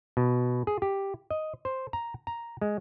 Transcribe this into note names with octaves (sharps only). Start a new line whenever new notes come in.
B2
G#4
G4
D#5
C5
A#5
A#5
G#3